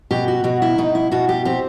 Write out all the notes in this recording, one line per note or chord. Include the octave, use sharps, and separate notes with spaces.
B2 G4
F#4
B2 F#4
E4
B2 D#4
E4
B2 F#4
G4
C4 G4